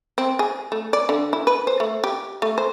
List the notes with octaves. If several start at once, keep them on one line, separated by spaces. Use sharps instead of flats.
C4
G#4
A3
D5
D3
E4
B4
C5
A3
G4
A3
C5